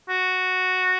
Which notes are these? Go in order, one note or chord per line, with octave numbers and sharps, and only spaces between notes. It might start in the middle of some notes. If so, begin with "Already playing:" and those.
F#4